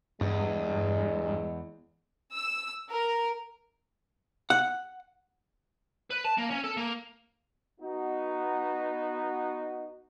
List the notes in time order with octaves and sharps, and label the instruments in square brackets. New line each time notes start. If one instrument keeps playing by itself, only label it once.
[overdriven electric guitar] E2 [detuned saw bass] G2 [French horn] G#3
[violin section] E6
A#4
[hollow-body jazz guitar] F#5
[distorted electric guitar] B4
A5
A#3
C#4
A4
A#3
[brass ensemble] B3 D#4 F#4